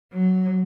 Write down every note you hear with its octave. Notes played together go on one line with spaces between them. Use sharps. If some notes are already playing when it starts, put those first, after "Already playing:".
F#3